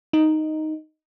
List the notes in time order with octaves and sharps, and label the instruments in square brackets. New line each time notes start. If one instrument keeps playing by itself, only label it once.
[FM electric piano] D#4